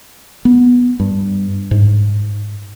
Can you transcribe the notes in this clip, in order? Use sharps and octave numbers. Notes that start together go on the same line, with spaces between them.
B3
G2
G#2